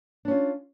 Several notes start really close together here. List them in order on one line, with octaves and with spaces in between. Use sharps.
D4 C#4 F4